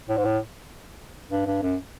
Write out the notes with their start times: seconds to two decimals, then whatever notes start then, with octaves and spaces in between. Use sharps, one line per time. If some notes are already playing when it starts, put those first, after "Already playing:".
0.09 A2
0.17 G#2
0.25 A2
1.31 G2
1.47 G2
1.62 F#2